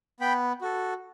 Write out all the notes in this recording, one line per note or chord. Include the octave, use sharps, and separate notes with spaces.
B3 G5 B5
F#4 A4